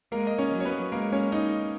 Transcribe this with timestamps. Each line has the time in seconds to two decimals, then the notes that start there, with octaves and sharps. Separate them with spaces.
0.12 G#3 A#3 A#4
0.27 D#5
0.38 C#4 C#5
0.52 F#3
0.60 C#5
0.65 B3 B4
0.92 G#3 A#3 A#4
1.12 C#4 C#5
1.32 D#4 D#5